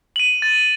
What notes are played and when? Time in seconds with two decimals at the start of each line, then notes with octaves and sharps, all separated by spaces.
0.16 D#7 F#7
0.42 A6